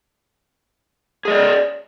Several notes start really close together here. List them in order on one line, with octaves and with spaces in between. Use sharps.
G#4 D#5 D5